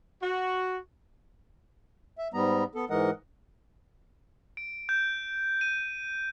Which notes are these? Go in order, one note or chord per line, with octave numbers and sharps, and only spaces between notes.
F#4
E5
G#2 G3 B3 A#5
B3 A4
G#2 E3 G#3 A#4 D#5 F#5
D7
G6
D#7